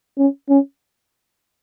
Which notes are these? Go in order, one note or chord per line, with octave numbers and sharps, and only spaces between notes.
C#4
C#4